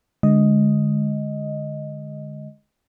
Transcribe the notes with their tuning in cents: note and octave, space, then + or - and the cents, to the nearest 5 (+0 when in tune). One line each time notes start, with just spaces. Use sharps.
D3 +5 G#3 +5 D#5 +0